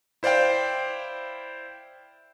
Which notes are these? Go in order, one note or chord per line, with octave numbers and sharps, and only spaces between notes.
E4 C5 D5 F5 G5